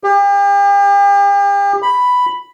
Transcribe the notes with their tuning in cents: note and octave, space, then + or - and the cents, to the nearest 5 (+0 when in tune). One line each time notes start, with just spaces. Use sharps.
G4 +40
B5 +5